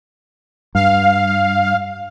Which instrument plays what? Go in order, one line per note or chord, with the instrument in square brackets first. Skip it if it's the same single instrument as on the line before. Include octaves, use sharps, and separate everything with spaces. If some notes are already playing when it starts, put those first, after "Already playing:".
[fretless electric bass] G2 [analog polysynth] F5